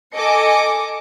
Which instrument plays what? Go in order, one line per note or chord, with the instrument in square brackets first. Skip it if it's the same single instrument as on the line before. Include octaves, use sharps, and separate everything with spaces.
[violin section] A4 D#5 G#5 D6 C#7